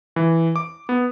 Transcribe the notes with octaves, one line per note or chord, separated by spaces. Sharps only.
E3
D6
B3